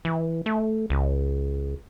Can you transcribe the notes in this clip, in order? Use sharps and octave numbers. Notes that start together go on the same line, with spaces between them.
E3
A3
C#2